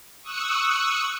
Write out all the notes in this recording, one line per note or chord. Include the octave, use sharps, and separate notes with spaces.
C#6 D#6 E6 F#6 C#7